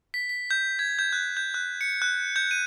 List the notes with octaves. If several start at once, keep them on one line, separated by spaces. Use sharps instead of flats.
B6
B6
G6
G#6
G6
F#6
G6
F#6
C#7
F#6
G6
D#7